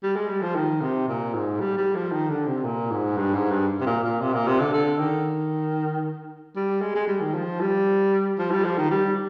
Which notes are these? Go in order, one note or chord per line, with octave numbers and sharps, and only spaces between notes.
G3
G#3
G3
F3
D#3
C3
A#2
G#2
G3
G3
F3
D#3
D3
C3
A#2
G#2
G2
G#2
G2
C3
A#2
A#2
C3
A#2
C3
D3
D3
D#3
G3
G#3
G#3
G3
D#3
F3
G3
F3
G3
F3
D#3
G3